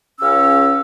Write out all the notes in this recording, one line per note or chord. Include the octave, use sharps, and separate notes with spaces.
C#2 C#3 C#4 F5 E6